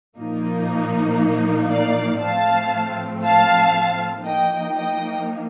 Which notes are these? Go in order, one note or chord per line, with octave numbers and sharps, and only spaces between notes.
A#2 F3 A#3 D#4
D5 F5
A2 F3 A3 C4 F5 A5
F5 A5
F3 A#3 D#4 D#5 G5
D#5 G5